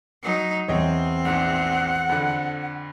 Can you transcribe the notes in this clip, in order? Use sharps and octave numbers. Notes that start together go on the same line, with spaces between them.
F#3 D#4
E2 C4 C#5 D#5 G5
A#1 G#2 F#5
F2 D3